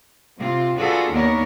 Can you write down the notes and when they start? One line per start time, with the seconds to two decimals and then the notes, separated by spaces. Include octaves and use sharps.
0.37 C3 C4 F4
0.78 D4 F4 F#4 G#4 A4 B4
1.10 D#2 B3 D4 A#4 C#5 D#5